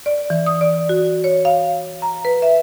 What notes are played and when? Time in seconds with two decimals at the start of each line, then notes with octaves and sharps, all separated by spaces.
0.06 D5
0.30 E3
0.46 D#6
0.61 D5
0.89 F#4
1.24 C#5
1.45 F5
2.02 A#5
2.25 B4
2.42 E5